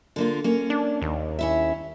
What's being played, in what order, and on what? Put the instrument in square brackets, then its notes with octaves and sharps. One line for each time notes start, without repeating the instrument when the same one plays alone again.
[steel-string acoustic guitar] D3 A#3 F4
A#3 C#4
[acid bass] D4
D#2
[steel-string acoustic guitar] C#4 E4 E5